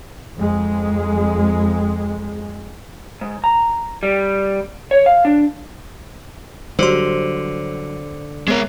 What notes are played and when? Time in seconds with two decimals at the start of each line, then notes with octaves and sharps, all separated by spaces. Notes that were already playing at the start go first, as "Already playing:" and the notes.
0.37 F2 G#3
3.21 G#2
3.44 A#5
4.03 G3
4.91 C#5
5.06 F5
5.25 D4
6.79 D3 F#3 G3 C5 C6
8.48 G#3 B3 A#4 C#5